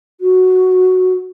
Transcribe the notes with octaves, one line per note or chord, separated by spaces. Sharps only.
F#4